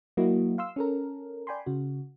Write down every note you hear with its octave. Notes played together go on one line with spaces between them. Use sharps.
F#3 A#3 E4 F#4 D#5
F5 C6 E6
C#4 A4 A#4
D5 G5 G#5 B5 C6
C#3 F#4